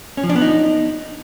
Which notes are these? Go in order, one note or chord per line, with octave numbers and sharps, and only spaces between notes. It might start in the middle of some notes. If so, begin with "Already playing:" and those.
C#4
F3
D4
B3
D#4